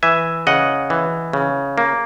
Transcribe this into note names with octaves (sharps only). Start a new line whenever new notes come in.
E3 E5 G#5
C#3 D#5 F#5
E3
C#3
A#3